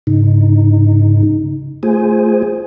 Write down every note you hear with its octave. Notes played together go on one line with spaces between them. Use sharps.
G#2 C#3 D#4
A3 F4 G#4 C5 G#5